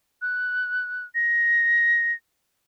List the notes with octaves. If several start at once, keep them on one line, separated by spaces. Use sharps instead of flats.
F#6
A#6